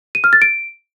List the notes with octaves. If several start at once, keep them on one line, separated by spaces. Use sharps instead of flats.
D#7
F6
A6
D7